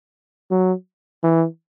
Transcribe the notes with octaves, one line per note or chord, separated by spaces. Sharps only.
F#3
E3